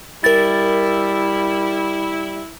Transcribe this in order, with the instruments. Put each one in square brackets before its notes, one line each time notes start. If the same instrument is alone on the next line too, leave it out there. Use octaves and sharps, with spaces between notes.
[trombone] G3 [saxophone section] E4 [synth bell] A#4 A6